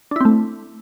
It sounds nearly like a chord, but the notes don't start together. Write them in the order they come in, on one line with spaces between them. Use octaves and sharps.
D4 E4 C4 A3